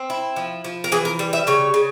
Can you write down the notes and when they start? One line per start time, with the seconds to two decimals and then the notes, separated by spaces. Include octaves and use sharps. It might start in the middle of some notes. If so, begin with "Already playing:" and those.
Already playing: C4
0.10 E4
0.36 F3
0.64 F3
0.84 A#4
0.92 E3 G#4
1.05 A#4
1.19 G3
1.33 E5
1.47 C#3 C#5
1.74 C#3